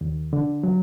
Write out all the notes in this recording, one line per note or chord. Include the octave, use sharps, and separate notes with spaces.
D#2
D3
F#3